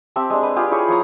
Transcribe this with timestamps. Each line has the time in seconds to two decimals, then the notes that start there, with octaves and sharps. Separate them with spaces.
0.16 C4 G4 E5 A5
0.30 G#3 D4
0.43 B4
0.56 F4 G4 G#4 B4
0.71 E4 G4 G#4 C#5
0.88 F3 C#5 A#5